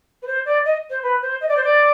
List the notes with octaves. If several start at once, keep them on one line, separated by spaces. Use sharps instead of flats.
B4
C5
D5
D#5
C5
B4
C5
D#5
D5
C5
D5